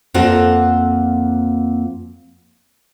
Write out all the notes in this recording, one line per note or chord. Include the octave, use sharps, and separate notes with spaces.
F2 A#3 C4 F4 F#5